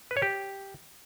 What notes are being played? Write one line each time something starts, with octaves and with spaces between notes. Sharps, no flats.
B4
C#5
G4